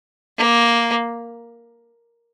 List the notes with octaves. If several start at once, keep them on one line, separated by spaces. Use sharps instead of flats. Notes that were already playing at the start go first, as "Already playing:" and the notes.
A#3